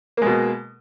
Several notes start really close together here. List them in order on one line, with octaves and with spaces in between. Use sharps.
A#3 G#3 B2